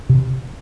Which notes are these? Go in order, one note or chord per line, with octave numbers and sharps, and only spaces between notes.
C3